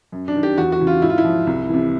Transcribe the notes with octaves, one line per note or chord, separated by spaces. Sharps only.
F#2
D4
D#3
G4
E2 F#4
F#4
C#3 E3
F4
G#2 E4
F4
E4
F3
C2
C3 E3